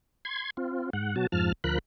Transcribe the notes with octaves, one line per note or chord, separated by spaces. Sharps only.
C6 G#6
C4 F4
G#2 F#5
B2 F#3 F#4 A5
F2 G#2 F3 A5 F6
D2 F3 A#4 B5 F#6